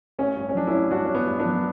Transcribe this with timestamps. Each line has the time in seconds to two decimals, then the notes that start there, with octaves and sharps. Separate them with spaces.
0.19 A1 C#4
0.37 G2
0.49 C#4
0.55 F#3 D4
0.67 C#4 E4
0.73 A1
0.91 G2 D4 F#4
1.05 A1 C#4
1.15 B3
1.27 G2
1.39 B3 D4
1.45 F#3